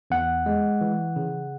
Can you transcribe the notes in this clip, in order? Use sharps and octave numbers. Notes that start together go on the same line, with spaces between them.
E2 F#5
G#3
E3
C#3